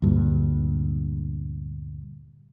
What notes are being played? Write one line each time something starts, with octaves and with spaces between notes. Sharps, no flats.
D2 G2 A#2